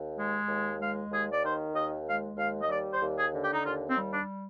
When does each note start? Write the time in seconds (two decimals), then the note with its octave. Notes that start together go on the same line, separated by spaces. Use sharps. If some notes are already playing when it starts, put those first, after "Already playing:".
Already playing: D#2
0.17 G#3
0.48 D#2
0.79 G#3 F5
1.11 D#2 G#4
1.32 D5
1.43 D#3 C5
1.74 D#2 D#5
2.06 G#3 F5
2.37 D#2 F5
2.61 D#5
2.69 G3 D5
2.93 C5
3.02 D#2
3.17 G#4
3.33 D3
3.41 G4
3.54 D#4
3.64 D#2 F4
3.88 C4
3.96 G3
4.12 D4